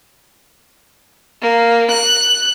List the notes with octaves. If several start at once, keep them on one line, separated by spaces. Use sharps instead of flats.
A#3
F#6